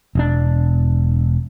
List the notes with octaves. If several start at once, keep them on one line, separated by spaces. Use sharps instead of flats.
E1 D4